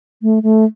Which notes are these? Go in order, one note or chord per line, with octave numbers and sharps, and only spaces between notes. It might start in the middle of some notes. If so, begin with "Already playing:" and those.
A3
A3